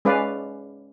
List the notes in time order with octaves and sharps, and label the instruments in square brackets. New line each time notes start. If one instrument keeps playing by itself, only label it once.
[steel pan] G#3 C#4 B4 D5 F5